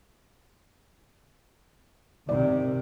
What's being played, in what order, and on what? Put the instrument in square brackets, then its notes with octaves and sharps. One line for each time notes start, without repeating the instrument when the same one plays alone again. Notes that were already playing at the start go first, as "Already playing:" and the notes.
[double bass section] C3 D#3 [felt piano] D5